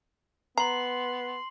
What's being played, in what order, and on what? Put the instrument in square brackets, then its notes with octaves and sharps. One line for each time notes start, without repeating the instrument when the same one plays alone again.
[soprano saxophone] B3 [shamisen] A#5 [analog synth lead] C6 [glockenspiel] C7 F#7